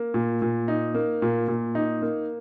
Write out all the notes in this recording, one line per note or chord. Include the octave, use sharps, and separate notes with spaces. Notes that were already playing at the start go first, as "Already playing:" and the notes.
Already playing: A#3
A#2
A#2
D#4
A#3
A#2
A#2
D#4
A#3